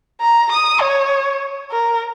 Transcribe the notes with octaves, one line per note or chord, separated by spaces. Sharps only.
A#5
D#6
C#5
A#4